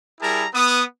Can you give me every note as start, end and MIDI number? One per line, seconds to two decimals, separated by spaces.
0.21 0.46 55
0.21 0.46 64
0.21 0.46 68
0.21 0.46 70
0.21 0.46 81
0.21 0.46 82
0.53 0.82 59
0.53 0.82 87